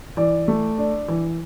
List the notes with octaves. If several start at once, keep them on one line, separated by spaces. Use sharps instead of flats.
E3 D5
A3
D4
E3